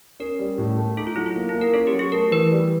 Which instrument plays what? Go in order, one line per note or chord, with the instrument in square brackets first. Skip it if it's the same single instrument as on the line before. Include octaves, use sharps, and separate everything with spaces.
[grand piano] C#4 [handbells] A#4
[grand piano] G3
A2
A3
[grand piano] D#4 [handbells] A4
[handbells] F4
[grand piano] F#3 [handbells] E4
[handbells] F4
[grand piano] A#3
[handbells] E4
[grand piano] A#3
[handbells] A#4
[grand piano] C#4 [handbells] A4
[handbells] G4
[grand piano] F#3
[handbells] G#4
[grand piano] A3 [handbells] A#4
[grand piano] E3 [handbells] B4
[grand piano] G3